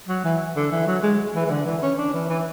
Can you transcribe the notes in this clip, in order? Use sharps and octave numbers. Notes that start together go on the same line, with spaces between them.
F#3
E3
D3
E3
F#3
G#3
E3
E3
D3
E3
C#4
D4
E3
E3